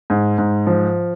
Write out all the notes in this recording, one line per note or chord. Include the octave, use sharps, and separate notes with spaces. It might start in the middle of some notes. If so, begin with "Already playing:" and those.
G#2
G#2
F3